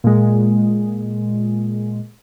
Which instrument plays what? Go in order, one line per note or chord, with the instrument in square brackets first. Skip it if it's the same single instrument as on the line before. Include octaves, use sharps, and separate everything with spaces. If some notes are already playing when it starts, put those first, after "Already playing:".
[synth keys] A#2 G#3